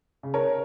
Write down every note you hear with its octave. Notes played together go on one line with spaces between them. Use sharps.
C#3
A#4 C#5